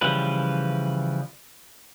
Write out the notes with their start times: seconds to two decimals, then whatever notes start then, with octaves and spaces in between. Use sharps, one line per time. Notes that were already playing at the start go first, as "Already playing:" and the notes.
0.01 C#3 E3 F3 G3 B4